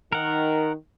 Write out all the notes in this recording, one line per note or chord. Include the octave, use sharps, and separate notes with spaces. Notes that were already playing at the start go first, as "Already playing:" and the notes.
D#3 A#4 F#5